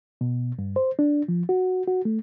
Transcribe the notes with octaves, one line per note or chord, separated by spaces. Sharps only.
B2
G2
C5
D4
F3
F#4
F#4
A3